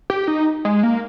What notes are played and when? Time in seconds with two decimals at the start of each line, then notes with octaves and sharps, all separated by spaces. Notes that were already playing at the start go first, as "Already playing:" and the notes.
0.10 G4
0.28 D#4
0.65 G#3
0.83 A#3